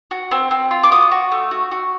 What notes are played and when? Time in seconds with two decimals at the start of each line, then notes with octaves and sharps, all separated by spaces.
0.11 F#4
0.31 C4
0.51 C4
0.71 F4
0.84 D6
0.91 F#4 D#6
1.12 F#4
1.32 A3
1.51 F#4
1.71 F#4